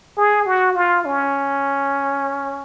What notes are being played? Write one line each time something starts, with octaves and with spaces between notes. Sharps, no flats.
G#4
F#4
F4
C#4